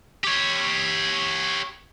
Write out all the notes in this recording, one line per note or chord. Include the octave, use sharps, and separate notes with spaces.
G4 C#5